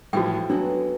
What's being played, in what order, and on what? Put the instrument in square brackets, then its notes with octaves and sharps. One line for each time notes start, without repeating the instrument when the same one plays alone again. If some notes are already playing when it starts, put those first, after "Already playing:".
[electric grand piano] A2 E3 F3 [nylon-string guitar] G#3 A3 D#4 [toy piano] F#4 G5
[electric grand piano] F#3 [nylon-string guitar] B3 F#4 A4 [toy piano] D4